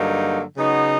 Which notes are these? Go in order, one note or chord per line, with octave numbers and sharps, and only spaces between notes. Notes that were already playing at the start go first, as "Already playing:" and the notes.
Already playing: G2 D3 F#3 A#3 D#4
C#3 F#3 B3 D#4